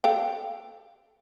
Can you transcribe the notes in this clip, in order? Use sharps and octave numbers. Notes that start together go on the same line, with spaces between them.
A4 F5 G5